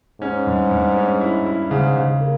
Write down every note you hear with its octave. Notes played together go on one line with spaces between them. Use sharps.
G#2 C#4
G2
G2
C#4
E4
E4
G#2 C#3
C#3
A#3